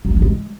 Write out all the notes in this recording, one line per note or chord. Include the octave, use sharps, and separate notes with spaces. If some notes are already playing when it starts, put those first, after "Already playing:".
F#3
A3
E3
B3
G#3